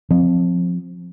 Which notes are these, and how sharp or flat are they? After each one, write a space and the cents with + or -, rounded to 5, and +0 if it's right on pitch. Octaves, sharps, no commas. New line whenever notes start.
F3 +20 C4 +0